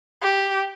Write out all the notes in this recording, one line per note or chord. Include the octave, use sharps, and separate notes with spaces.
G4